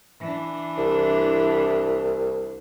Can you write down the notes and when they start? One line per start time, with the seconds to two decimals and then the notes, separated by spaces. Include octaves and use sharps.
0.20 E3 D4
0.78 C2